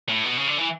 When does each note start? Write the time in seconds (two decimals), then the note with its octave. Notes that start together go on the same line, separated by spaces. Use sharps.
0.09 A2
0.24 B2
0.37 C#3
0.47 D3
0.57 E3